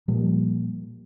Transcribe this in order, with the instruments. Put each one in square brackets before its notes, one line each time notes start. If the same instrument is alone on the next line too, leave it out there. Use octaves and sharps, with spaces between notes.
[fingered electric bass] A#2 F3 G3 A#3